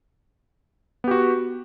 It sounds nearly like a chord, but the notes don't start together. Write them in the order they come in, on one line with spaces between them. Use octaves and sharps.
B3 G4 F#4